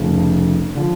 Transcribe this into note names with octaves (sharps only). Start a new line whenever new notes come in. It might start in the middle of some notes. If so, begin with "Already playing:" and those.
Already playing: F1 F2 C#3 F3 A3
D3 F3